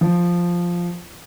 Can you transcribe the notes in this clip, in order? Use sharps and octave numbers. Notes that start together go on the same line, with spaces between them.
F3